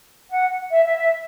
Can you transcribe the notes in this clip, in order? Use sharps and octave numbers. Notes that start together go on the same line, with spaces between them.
F#5
E5
E5
E5